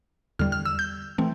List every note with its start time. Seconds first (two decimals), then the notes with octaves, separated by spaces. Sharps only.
0.39 E2 D3 G3 F6
0.52 F6
0.65 E6
0.79 G6
1.18 E3 A3 C4